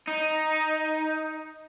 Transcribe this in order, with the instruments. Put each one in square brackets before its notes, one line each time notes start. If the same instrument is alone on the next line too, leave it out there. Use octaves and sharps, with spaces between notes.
[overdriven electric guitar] D#4